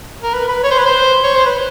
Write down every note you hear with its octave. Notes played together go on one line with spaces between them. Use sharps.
A#4
B4
B4
C#5
C5
B4
C5
C#5
C5
B4